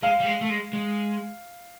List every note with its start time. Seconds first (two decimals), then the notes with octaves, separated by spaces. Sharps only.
0.03 G#3 F5
0.20 G3
0.26 G#3
0.41 A3
0.50 G#3
0.73 G#3